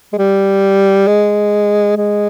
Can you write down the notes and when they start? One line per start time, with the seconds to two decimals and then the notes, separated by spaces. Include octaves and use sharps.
0.13 G#3
0.17 G3
1.07 G#3
1.97 G#3